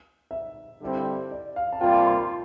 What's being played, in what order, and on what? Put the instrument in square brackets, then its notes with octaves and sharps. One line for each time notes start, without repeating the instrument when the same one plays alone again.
[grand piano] E5
[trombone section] G2 D3 G3 C4 E4
[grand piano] D5
F5
A5
[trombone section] C3 G3 A#3 F4 [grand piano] G5
[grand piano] A5
C6
C6